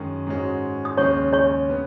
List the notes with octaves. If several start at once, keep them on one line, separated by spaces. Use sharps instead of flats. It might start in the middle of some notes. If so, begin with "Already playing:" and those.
Already playing: F#2 D#3 G#3 C#4
G#2 G#3 C#4 F#4
D#6
D#2 C#3 G#3 C#4 C#5 C#6
C#5 C#6
C#3 B3